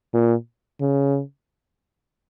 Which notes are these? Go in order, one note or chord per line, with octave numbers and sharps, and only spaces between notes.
A#2
C#3